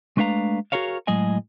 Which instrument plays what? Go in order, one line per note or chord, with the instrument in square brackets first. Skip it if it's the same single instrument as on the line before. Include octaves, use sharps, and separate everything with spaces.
[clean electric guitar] G#3 A3 D4 B4 F5 A#5
F#4 G#4 A#4 C#5 F5
A2 F#3 G#3 G#4 D#5 G#5